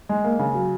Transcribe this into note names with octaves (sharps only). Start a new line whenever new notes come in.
G#3
A#3
C#3
F#3